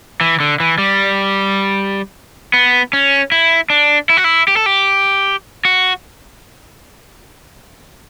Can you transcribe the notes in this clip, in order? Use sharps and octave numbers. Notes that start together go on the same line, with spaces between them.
E3
D3
E3
G3
B3
C#4
E4
D4
E4
F#4
E4
G4
A4
G4
F#4